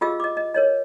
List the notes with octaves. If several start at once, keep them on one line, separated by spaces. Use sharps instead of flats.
F4 G4 G#4 D#5 F5 E6
D#5 D6
D#5
A#4 C#5 D#5